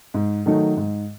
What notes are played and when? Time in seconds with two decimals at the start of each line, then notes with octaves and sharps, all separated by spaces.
0.14 G#2
0.46 D#3 F#3 A3 D#4
0.77 G#2